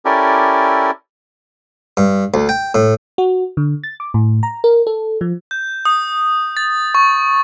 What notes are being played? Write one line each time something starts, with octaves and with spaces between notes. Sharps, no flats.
C#4 E4 G4 A4 A#4 D5
G2
D2
G5
A2
F#4
D3
A6
D6
A2
A#5
A#4
A4
F3
G6
D#6
A6
C#6